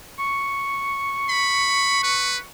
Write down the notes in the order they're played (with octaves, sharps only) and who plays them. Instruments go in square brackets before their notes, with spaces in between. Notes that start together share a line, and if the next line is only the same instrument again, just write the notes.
[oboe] C#6
[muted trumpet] B5
B4